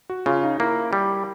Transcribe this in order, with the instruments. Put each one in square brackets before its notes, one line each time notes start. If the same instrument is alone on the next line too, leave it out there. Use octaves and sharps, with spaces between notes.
[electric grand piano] F#4
[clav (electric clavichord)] C#3 [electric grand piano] F4
[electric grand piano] D#4
[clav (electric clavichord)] A#3 [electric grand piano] E4
[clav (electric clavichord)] G3